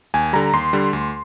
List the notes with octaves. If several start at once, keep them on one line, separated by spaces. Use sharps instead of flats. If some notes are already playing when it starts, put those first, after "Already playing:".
D#2 G#5
D3 G3 A#5
D#2 C6
D3 G3
D2